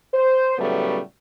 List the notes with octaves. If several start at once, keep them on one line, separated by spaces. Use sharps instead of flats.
C5
A2 C#3 F#3 G3 A3 B3